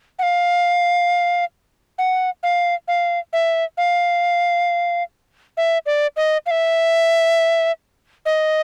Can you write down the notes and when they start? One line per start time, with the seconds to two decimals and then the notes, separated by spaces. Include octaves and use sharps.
0.19 F#5
0.23 F5
1.98 F#5
2.43 F5
2.88 F5
3.33 E5
3.77 F5
5.57 E5
5.86 D5
6.17 D#5
6.46 F5
6.51 E5
8.26 D#5